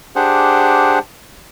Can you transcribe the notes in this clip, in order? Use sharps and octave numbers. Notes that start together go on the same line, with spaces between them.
D4 G4 G#4 C5 F#5